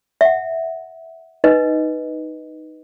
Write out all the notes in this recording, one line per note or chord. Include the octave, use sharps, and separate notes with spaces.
E5 F#5
D#4 B4 D#5